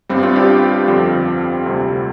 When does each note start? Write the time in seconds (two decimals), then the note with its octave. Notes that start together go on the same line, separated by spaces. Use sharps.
0.09 G1 G2 G3 C4
0.23 C4 F4
0.36 D4 G4
0.88 F2 D3 G3 C4 F4
1.66 D2 C3 G3